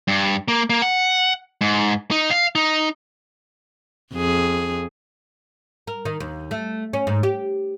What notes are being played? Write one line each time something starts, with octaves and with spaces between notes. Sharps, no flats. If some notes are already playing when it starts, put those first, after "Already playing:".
G2
A#3
A#3
F#5
G#2
D#4
F5
D#4
F2 G#4
A#4
D#3
D#2
A3
C#4
G#2
G4